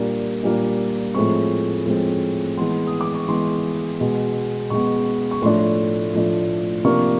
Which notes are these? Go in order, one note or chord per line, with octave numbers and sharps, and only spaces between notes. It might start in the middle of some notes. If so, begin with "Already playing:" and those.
Already playing: A#2 G3 A#3 D4
A#2 G3 A#3 D4
A2 F3 G#3 C4 C#6
A2 F3 G#3 C4
E3 G#3 B3 C6
D#6
D6
C#6
E3 G#3 B3 C6
B2 G#3 B3
B2 G#3 B3 C#6
C#6
A2 F3 A3 D4 C6
A2 F3 A3 D4
C3 F3 A#3 D4 C#6